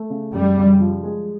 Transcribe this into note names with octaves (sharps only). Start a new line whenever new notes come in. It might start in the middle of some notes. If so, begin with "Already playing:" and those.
Already playing: A3
C#3
F#2 G3
C#3
F3
G#3